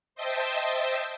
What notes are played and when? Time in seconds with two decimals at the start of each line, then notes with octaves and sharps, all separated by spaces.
0.15 C5 D#5 E5 G5 A5